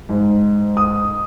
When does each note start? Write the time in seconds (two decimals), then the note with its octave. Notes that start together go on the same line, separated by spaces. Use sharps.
0.09 G#2
0.77 D#6